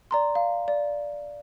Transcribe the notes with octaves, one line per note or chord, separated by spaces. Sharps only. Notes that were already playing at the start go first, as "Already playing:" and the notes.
D5 A#5 C6
F5
D5